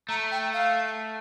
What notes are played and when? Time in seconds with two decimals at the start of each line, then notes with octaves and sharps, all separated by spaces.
0.09 A3 A#5
0.31 G5
0.53 F5